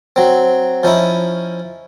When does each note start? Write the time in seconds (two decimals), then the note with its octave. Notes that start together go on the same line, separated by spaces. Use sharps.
0.16 F#3 C4
0.83 F3 C#4 D#4 E4